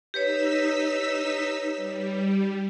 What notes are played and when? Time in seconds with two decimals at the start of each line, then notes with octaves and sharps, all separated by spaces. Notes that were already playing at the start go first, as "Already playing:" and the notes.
0.14 D#4 G4 B4 C#5 E6 B6
1.76 G3